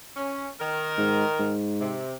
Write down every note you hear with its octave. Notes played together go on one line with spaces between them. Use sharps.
C#4
D#3 A#4
G#2
G#2
C3